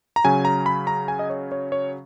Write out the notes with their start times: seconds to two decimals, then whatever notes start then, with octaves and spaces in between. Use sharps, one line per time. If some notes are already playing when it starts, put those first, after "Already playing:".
0.16 A#5
0.24 C#3 F#3 C#4 G#5
0.45 A#5
0.66 B5
0.87 A#5
1.08 G#5
1.19 D#5
1.30 C#5
1.52 C#5
1.72 C#5